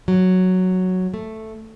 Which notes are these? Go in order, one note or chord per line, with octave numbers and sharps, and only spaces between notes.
F#3
A3